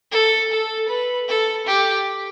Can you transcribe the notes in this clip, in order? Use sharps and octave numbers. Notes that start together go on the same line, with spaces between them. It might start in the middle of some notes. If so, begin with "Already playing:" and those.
A4
A4
B4
A4
G4